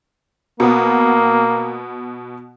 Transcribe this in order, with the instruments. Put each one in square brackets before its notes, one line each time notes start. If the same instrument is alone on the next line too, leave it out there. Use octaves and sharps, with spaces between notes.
[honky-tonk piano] B2 B3 [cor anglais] A#3